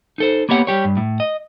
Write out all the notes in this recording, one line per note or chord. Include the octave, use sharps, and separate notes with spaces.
D#4 A4 C5
A#3 B3 G4 C#5 E5 F#5
G3 G4 C#5
G2
A2
D#5